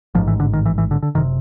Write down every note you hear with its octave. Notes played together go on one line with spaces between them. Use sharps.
A1 G#2 F3
E3
D3
D#3
E3
E3
D3
D3
F#1 C3 D#3